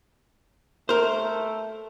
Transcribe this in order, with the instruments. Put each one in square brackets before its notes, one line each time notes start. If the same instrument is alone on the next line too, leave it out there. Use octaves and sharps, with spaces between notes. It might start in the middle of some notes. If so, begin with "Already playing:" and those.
[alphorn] A3 [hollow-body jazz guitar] A#4 C5